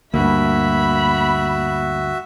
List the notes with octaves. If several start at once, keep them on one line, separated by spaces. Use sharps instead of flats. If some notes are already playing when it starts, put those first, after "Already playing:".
D2 G2 A#3 F#4 E5 B5